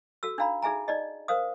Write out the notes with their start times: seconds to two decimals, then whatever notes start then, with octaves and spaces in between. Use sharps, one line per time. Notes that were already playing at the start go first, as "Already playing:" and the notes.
0.23 F#4 A4 E6
0.38 D4 D#4 F5 A#5 B5
0.62 D#4 G#4 E5 G#5 A#5
0.88 D#4 D5 D#5
1.28 A#4 C5 F5 D#6